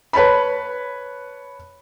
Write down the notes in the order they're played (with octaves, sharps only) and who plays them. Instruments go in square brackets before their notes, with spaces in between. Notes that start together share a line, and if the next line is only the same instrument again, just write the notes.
[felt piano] B4 C#5 A5 B5